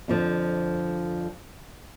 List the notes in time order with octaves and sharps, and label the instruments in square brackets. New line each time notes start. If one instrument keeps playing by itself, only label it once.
[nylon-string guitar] F2 D3 F3